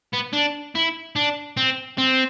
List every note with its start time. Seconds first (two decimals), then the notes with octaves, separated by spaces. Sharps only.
0.13 B3
0.33 D4
0.75 E4
1.16 D4
1.57 C4
1.98 C4